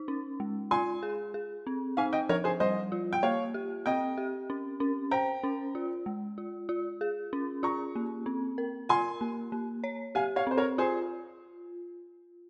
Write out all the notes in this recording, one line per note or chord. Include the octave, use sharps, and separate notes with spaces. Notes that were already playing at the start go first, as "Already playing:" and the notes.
Already playing: D#4
C#4
G#3
F4 G#5 C6
G#4
G#4
C4
D#4 F5 G#5
D#5 G5
F3 A#4 C#5
G#4 C5
G3 C5 D#5
F4
G5
A#3 C#5 F5
G4
C4 D#5 G5
G4
C#4
C#4
C5 G5 A#5
C#4
F4
G#3
F4
F4
G#4
C#4
F4 A#5 C#6
A#3
C4
A#4
F4 G#5 C6
A#3
A#3
C#5
G4 F5 G#5
C#5 F5
C4 C5
A#4 C#5
F4 G#4 C5